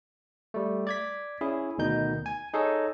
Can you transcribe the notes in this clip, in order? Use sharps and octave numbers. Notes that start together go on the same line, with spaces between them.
G3 A3
D5 G#6 B6
C#4 E4 G#4
D2 B2 D#3 D#4 G6
G#5
D#4 G#4 A4 C#5